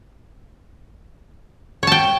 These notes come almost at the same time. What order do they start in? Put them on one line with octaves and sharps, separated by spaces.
C#5 A5 G5